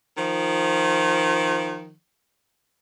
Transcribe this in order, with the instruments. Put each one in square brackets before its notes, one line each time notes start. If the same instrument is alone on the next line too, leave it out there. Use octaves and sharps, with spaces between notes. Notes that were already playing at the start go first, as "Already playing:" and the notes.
[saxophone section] D#3 F3